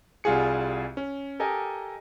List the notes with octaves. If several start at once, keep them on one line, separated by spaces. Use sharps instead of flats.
C2 G3 F4 F#4 G#4 C#7
C#4
G4 A4 A#4 D#5 G#5